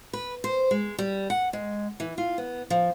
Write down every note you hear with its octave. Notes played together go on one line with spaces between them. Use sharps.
B4
C5
G#3
G3
F#5
G#3
E3
F4
B3
F3